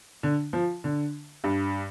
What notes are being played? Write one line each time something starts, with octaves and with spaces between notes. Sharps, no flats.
D3
F3
D3
G2